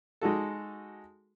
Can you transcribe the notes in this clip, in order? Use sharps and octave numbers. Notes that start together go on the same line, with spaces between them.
G#3 D#4 F#4 A4